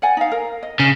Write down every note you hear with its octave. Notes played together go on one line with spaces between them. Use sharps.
D5 F#5 G#5
D#4 F5
A#4
D#5
C#3